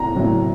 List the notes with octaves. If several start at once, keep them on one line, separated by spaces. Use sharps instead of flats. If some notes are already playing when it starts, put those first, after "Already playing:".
Already playing: A2 A#5
A2 F#3